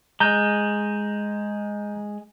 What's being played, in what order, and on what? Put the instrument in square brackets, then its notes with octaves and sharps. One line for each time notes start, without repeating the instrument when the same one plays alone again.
[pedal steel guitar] G#3 [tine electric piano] A#5 G6